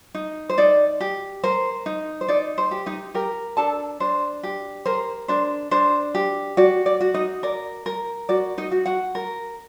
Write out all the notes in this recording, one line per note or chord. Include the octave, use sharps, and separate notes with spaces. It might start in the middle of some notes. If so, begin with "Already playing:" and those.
D#4
C5
D#4 D5
G4
A#4 C5
D#4
C5
D#4 D5
C5
G4
D#4 D#5
G4 A#4 G5
D4 A4 A5
D4 C5
G4
A#4 C5
D4 C5
D4 C5
G4
F#4 D5
D5
F#4
D#4 D#5
A#4 D5
A#4
F#4 D5
D#4 D#5
F#4
F#4 F#5
A#4